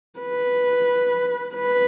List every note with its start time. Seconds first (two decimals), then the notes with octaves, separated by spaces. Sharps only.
0.19 B4
1.55 B4